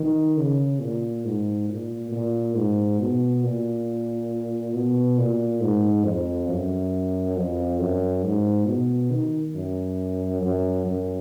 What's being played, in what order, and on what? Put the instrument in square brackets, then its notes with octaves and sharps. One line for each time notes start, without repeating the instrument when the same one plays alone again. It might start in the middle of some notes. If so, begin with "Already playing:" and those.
Already playing: [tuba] D#3
C#3
A#2
G#2
A#2
A#2
G#2
B2
A#2
B2
A#2
G#2
F2
F#2
F2
F#2
G#2
B2
D#3
F#2
F#2
F#2